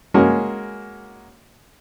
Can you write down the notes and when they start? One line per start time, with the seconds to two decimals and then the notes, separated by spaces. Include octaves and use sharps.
0.14 G#3 A#3 C#4 F#4